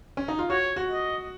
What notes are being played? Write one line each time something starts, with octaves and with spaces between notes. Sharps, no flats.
C#4
D#4
F4
F#4 C#5
F#4
D#5